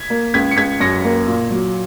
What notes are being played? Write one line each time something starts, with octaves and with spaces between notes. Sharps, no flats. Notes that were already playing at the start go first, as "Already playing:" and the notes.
Already playing: G#6 B6
A#3
C#2 G#6 B6
C#7
C#2 G#6 B6
F#2 A#6 C#7
A#3
A#2
F#3